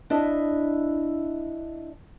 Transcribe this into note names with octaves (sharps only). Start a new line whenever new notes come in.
D4 E4 D#5 E5